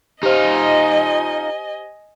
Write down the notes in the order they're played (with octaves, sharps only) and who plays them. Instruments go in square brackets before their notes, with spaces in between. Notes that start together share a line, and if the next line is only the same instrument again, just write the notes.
[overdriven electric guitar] D#4 F4 [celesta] G4 C5 [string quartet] D#5 G#5